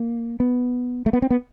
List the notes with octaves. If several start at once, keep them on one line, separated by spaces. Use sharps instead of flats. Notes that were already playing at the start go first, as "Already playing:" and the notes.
Already playing: A#3
B3
A3
B3
C4
B3